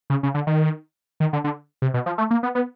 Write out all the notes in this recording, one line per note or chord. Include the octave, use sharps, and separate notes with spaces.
C#3
C#3
D3
D#3
D#3
D3
D3
C3
B2
F3
A3
A#3
B3
B3